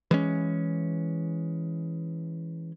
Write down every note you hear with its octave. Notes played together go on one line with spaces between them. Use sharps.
E3 G#3 C#4